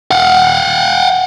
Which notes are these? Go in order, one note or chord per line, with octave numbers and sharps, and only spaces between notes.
F5 F#5